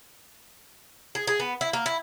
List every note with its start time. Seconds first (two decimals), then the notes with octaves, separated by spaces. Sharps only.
1.15 G#4
1.27 G#4
1.40 B3
1.61 E4
1.73 A#3
1.86 E4